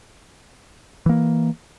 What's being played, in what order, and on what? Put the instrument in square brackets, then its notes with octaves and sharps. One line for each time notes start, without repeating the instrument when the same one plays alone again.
[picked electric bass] E3 A#3